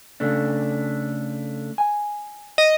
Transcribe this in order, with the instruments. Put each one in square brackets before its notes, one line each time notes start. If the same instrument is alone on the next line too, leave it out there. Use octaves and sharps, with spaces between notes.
[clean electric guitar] C#3 A3 D4
G#5
[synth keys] D#5